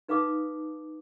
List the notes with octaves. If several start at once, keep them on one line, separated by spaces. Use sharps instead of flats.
D#4 B4 F5 A5 D6 D#6